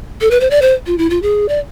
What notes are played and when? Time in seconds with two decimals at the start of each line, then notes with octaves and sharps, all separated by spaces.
0.21 A4
0.31 B4
0.40 C5
0.50 D5
0.62 C5
0.87 F4
0.98 E4
1.10 F4
1.22 G#4
1.48 D5